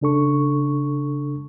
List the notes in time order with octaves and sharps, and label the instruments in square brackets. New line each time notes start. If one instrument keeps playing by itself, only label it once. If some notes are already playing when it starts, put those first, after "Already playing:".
[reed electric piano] C#3 D4 A4 C#6